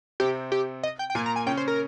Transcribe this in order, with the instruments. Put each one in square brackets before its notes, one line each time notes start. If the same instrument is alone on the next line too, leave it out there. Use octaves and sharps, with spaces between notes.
[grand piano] C3 C4 [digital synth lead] G4
[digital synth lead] G4
D#5
G5
G5
[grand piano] A#2 A#3 [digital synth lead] G#5
[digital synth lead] A#5
G#5
[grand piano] C#3 C#4 [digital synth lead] G5
[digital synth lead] C5
A#4